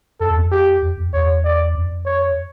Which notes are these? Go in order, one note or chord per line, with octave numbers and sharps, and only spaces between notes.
F#2 A4
E2
F2
G4
F2
F2
E2 C#5
D5
F2
C#5